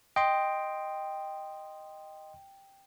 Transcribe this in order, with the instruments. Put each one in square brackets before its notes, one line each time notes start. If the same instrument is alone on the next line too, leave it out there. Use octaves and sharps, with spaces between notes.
[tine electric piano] D#5 C6 [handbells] G5